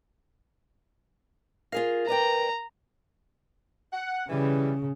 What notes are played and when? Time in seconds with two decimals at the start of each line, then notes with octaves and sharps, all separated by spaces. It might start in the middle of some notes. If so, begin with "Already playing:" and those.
1.72 F4 G#4 A#4 F5
2.08 B4 D5 G5 A#5
3.92 F#5
4.29 C#3 E3 G3